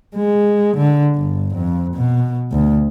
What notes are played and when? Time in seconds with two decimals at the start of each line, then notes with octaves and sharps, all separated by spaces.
0.16 G#3
0.77 D3
1.16 G1
1.55 F2
1.95 B2
2.52 D2